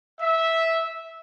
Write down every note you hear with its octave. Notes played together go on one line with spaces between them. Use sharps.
E5